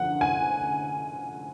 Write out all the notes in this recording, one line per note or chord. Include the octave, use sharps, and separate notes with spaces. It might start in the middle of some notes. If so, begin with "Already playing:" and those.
Already playing: D3 F3 F#5
G#5